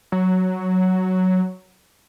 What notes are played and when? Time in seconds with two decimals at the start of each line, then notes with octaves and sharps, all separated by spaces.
0.12 F#3